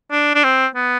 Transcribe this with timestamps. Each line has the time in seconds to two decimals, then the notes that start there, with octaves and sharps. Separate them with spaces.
0.12 D4
0.35 D4
0.44 C4
0.76 B3